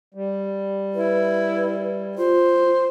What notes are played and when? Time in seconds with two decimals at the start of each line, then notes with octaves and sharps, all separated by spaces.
0.14 G3
0.95 E4 B4
2.18 F4 C5